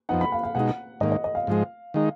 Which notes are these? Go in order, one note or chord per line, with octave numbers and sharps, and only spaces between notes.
F2 F3 B3 D#4 F#5
B5
F5
F5
B2 G#3 D#4 F#5
G#2 D#3 A#3 D#5
D#5
D#5
F5
G#2 F3 G#3
D#3 G#3 D#4